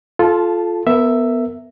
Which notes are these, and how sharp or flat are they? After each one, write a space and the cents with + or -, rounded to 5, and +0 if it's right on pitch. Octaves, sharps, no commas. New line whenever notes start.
F4 +0 A4 -25 A5 +0
B3 +0 A#4 -30 E5 +5